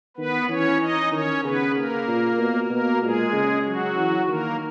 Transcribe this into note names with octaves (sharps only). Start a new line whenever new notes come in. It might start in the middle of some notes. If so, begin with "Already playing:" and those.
D#3 B3 B4
E3 C#4 C#5
D#4 D#5
D#3 C#4 C#5
C#3 B3 B4
A#3 A#4
A#2
B2
B2 A#3 A#4
A#2 G#3 G#4
C#3
F#3 F#4
E3
D#3 A#3 A#4